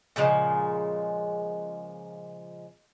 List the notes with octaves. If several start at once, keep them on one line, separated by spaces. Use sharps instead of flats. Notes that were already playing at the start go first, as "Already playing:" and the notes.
A#2 C#3 F3 G#3